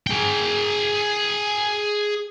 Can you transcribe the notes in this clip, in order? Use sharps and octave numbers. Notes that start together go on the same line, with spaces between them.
G#4 G5